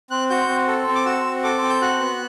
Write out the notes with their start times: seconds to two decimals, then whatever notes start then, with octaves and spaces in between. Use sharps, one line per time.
0.11 C4 F#6
0.30 F#4 G6
0.48 C4
0.68 A4
0.87 C4
0.95 D6
1.06 F#4 E6
1.24 C4
1.44 A4 D6
1.62 C4
1.70 G6
1.82 F#4 F#6
2.00 B3